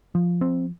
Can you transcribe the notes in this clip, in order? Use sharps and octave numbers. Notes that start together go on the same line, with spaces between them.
F3
C4